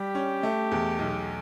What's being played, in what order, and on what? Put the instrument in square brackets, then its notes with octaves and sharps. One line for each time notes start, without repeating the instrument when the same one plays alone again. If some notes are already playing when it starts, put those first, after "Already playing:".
Already playing: [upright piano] G3 [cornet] G4
[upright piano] C#4
A3
E2
B1